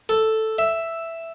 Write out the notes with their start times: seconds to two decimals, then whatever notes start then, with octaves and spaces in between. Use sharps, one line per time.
0.09 A4
0.58 E5